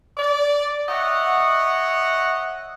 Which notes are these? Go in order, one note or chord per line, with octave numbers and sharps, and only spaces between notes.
D5
C#5 D#5 E5 F#5